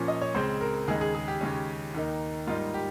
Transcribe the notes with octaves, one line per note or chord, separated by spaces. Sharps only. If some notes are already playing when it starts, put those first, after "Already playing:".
Already playing: A#2 F3 A#3 C#4
D#5
C#5
C#2 C#3 G#3 C4 C5
A#4
D#2 C#3 G#3 D#4 G#4
G#4
G#4
G4
D#2 C#3 G#3 C#4
D#2 D#3 A#3 D#4
G#2 G3 A#3 D#4 F4
G4